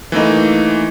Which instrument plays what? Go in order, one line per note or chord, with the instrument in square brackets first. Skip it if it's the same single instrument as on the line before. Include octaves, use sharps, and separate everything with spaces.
[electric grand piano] E3 A3 A#3 D#4